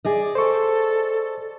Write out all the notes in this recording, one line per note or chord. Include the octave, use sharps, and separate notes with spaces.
G#4 D5 D#5
A4 C5 C#6